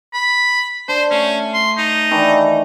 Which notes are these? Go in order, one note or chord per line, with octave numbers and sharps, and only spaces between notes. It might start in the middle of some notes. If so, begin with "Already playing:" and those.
B5
D4 C5
A3 C#4
C6
D#4
D#3 E3 D4